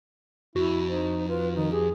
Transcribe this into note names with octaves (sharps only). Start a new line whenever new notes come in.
F2 E4 F#4
D#4 C5
F4 B4
D#3 D#4
G4 G#4